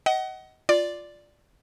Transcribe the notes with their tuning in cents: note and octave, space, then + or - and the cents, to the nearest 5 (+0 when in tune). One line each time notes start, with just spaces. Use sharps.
D#5 +20 F#5 +25
F4 +0 D5 +0